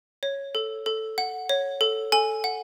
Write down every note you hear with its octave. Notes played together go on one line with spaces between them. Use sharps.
C#5
A4
A4
F#5
C#5
A4
A4 G#5
F#5